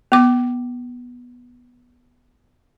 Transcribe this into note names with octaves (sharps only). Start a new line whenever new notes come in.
B3 D6